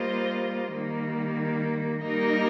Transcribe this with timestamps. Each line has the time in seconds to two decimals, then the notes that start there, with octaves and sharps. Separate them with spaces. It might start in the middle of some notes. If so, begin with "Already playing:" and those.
Already playing: G3 A#3 F4 C5 D#5
0.73 D#3 G3 A#3
2.05 G3 A#3 D#4 A#4 D#5